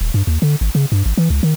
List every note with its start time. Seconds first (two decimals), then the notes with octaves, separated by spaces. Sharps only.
0.01 D#1
0.14 G2
0.27 D#2
0.42 D3
0.61 G#1
0.75 C#3
0.92 G2
1.06 G#1
1.17 E3
1.30 C#2
1.43 D#3